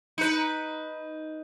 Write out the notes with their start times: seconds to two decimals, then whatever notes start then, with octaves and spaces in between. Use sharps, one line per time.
0.18 D#4 B4